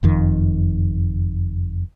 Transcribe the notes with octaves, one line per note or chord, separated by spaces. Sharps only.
F#1 F2 D#3